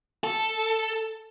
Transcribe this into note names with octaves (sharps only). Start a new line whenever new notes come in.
A4